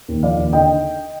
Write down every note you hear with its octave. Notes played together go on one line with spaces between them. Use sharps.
D#2
F3 D5 F5
D#2
D3 D#5 G5